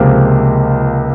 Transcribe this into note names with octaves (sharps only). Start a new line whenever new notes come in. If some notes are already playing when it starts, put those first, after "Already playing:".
Already playing: C#2 C3 F3 A#3 F5